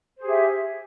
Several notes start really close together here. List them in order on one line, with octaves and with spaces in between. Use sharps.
C5 G#4 G4 E5